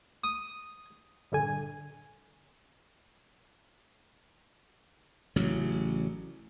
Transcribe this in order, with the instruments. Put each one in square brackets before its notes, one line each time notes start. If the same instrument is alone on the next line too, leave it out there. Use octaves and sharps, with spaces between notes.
[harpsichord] D#6
[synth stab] A#1 G2 D3 G#5
[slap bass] A1 C#3 F#3